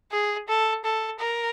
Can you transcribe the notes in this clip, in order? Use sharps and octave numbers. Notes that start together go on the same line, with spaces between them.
G#4
A4
A4
A#4